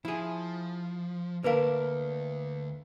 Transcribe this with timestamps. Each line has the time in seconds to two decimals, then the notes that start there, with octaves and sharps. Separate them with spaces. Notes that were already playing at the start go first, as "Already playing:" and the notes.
0.05 F3 E4 G#4
1.44 D2 A#3 D4 A#4 B4 F5